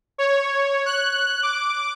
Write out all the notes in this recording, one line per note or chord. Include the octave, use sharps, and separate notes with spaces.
C#5
F#6
D6